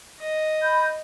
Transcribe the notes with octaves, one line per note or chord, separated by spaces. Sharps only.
D#5
B5 G6